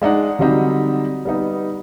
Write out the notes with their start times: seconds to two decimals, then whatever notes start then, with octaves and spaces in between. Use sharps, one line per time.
0.02 G#3 D4 D#4 F#5
0.39 D3 F#3 G3 C4 D#4
1.25 G3 B3 D#4